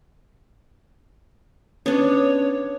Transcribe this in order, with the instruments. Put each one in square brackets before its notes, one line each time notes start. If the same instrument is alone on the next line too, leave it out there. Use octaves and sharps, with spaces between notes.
[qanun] B3 D4 [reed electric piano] C#4 [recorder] C#5